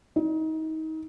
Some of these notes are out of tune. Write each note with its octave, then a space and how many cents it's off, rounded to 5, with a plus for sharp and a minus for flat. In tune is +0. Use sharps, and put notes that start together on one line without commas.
D#4 +30